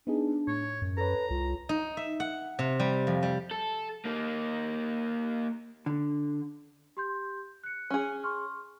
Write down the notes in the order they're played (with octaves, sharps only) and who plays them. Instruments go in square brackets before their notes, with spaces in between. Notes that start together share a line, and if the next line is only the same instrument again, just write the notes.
[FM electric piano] B3 D#4 G#4 [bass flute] D4
[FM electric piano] A2 [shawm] C#5
[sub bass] F#2
[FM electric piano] A4 C#5 [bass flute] B4 [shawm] A#5
[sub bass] C2 [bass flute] F4
[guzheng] D#4
E5
F#5
C3
G3
F2
G3
[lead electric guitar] A4
A#3 D#4
[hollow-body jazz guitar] D3
[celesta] G4 C6 G6
F#6 C#7
[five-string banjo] C#4 G#4
[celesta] C6 C#6 F6